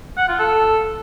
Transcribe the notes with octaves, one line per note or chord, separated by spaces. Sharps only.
F#5
F4
A4